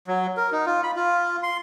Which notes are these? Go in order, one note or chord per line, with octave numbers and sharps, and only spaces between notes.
F#3
A#4
D#4
F4
B5
F4
C6